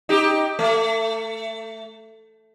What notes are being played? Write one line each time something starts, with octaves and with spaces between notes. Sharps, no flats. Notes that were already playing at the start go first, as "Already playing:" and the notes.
D#4 G4
A3